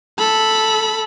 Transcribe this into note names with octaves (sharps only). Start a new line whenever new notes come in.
A4 B5